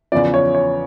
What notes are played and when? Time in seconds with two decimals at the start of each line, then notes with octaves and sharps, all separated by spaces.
0.12 E2 C#3 F3 D5
0.34 C#5
0.55 C#5